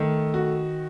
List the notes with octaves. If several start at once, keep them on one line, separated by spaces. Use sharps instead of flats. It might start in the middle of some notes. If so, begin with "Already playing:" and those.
Already playing: D#3 A3
F#4